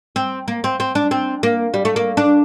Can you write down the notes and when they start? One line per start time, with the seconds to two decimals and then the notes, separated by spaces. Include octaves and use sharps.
0.16 C4
0.48 A#3
0.64 C4
0.80 C4
0.95 D4
1.11 C4
1.43 A#3
1.74 G3
1.85 A3
1.96 A#3
2.17 D4